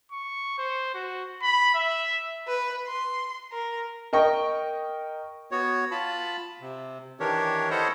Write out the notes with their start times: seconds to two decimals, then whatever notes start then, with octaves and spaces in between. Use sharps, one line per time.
0.12 C#6
0.58 C5
0.94 F#4
1.42 B5
1.75 E5
2.47 B4
2.87 C6
3.52 A#4
4.13 A#4 D#5 G5 C#6
5.52 B3 F#4 C#5
5.91 F4 A5 B5
6.61 C3
7.20 D#3 E3 D4 G4 A#4 C#5
7.71 E4 A4 C5 C#5 D#5 F#5